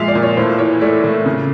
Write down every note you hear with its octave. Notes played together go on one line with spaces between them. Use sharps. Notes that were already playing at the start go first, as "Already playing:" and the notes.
Already playing: A#2 F3 G#3 E5 F5
D5
A#2
C#5
A2 C5
E3 C#5
A3 D5
A2
C#3